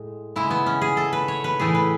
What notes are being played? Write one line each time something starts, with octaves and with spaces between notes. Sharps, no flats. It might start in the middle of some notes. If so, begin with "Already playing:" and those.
Already playing: A2 G#3
C#3 G#3 E4
B3
C#4
G#4
A4
B4
C#5
B4
A2 E3 A3 G#4
B4